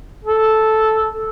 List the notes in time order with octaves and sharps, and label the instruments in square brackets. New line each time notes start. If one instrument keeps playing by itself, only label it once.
[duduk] A4